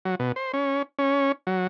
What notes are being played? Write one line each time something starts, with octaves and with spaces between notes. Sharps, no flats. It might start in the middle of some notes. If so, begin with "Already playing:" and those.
F#3
B2
C5
C#4
C#4
F#3